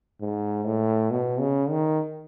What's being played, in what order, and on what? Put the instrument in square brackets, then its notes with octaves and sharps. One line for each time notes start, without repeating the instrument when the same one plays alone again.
[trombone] G#2
A2
B2
C#3
D#3